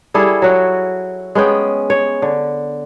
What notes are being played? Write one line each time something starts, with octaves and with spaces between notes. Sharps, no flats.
G3 E4 G#4 A4
F#3 F#4
G#3 B3 C#4 G5
C#5
D3